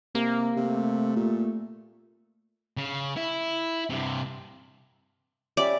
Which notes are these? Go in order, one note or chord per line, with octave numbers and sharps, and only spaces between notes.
C3 A#3
C3 A3
A#2
C#3
E4
G2 C3
G3 C#4 D5 E5